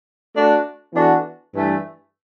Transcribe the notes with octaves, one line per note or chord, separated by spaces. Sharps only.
A3 D4 F#4
E3 B3 D4 F#4 A4
G2 E3 A3